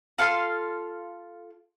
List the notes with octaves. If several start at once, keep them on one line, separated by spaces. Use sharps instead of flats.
F4 A4 F5 C6